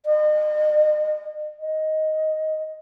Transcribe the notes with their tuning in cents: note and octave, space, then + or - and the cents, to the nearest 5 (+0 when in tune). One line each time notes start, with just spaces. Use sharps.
D#5 -35
D#5 +5